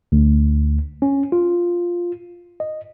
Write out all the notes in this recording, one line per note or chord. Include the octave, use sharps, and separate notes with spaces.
D2
C#4
F4
D#5